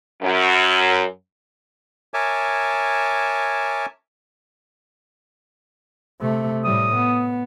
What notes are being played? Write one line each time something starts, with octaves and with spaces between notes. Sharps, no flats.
F#2
A#4 C#5 E5 G#5 A5 D6
C3 A3
A2 G3 D#6
B3